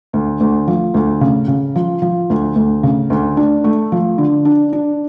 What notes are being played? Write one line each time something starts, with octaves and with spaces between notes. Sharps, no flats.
D2
D2
F3
D2
C#3
C#3
F3
F3
D2
D2
C#3
D2
D4
A3
F3
D3
D4
D4